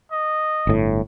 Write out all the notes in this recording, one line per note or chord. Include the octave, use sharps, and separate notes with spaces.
D#5
G1 A2